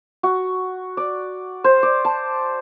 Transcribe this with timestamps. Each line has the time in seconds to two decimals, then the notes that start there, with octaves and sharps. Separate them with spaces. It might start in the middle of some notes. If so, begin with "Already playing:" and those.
0.23 F#4
0.97 D5
1.64 C5
1.83 D5
2.05 A5